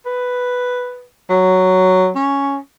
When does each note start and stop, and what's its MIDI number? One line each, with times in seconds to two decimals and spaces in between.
0.06 1.05 71
1.30 2.10 54
2.15 2.58 61